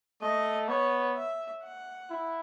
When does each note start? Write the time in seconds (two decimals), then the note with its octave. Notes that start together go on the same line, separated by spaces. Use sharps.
0.21 A3 D#5
0.68 B3 C#5
1.16 E5
1.63 F#5
2.10 E4